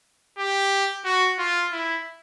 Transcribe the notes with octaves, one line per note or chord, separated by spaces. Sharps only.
G4
F#4
F4
E4